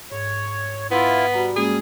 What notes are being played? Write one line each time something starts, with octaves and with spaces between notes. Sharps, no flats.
G#2 C#5
B3 E4 F4
G3 F#4 A#5
G#3 A#3 C#4 G#4